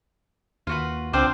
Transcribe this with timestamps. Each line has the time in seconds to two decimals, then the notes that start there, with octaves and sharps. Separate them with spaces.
0.67 D#2 F4 F#4 B4
1.13 C#2 C4 D4 F4 C5 D6